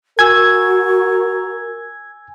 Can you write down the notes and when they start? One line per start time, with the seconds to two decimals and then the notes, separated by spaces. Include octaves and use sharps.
0.19 F#4 A#4 G#5 E6 G#6